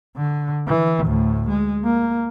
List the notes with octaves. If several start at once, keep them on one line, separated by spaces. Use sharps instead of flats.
D3
E3
D2 A2
G#3
A#3